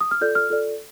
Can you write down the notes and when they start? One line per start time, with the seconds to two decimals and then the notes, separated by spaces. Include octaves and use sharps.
0.01 D#6
0.11 F6
0.21 F4 A4 D5 G6
0.35 F6
0.50 F4 A4 D5